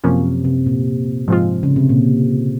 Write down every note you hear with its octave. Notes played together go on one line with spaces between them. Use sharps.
F#2 C3 F3 A#3 C#4
C3
A#2
G#2 F3 G#3 C4 F4
C#3
C3
A#2